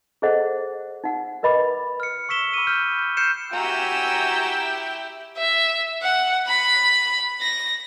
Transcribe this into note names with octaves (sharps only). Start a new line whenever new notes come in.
G#4 A4 C5 D#5 F#5
D#4 F#5
A#4 B4 D#5 B5 D6
F6 C#7
C#6 E6 B6 E7 G7
B5 D6 E6 D#7
F6 G6
F6 G6 C7 C#7 E7
E4 F#4 G4 G5 G#5 A#5 E6 G6
E5
F#5
B5
A#6